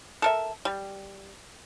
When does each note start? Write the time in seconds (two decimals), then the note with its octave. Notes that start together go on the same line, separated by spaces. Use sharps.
0.22 A4 A#4 E5
0.65 G3